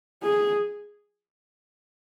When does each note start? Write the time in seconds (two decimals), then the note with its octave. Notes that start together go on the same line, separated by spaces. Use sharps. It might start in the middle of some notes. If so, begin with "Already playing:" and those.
0.24 G#4